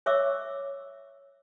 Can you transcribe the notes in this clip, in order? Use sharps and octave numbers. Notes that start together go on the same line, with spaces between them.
C#5 E5 C#6 D6 E6